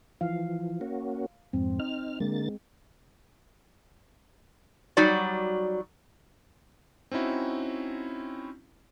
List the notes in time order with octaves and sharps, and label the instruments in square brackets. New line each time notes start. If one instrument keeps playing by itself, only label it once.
[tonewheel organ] E3 F3 [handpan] F5
[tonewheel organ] A#3 C#4 F#4
[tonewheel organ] F2 G#2 [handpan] C4
[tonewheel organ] D#4 F6
[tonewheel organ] D3 A#3 A6 [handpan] G#3
[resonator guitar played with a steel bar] F#3 G3 D#4 F#4 D5
[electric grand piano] C4 C#4 D#4 E4 F#4